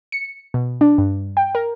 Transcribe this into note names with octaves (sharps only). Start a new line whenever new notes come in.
C#7
B2
D4
G2
G5
A#4